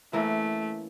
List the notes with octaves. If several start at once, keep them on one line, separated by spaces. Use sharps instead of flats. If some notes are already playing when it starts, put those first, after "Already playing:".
E3 A3 A#3 C#4